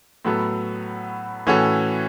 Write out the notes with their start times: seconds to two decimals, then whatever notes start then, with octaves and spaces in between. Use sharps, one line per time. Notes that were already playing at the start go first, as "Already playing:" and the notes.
0.25 A2 F#3 B3 A4
1.47 A2 E3 C#4 F#4 A4